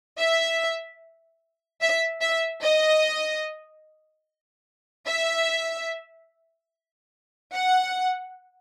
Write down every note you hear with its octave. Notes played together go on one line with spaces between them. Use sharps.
E5
E5
E5
D#5
E5
F#5